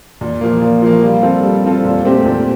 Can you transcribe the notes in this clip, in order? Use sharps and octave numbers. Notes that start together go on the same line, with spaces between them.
A#2
F3 A#3
A#2
F3 A#3
G3
C4 F4 A4
G3
C4 F4 A4
A#2
A3 C4 G4
A#2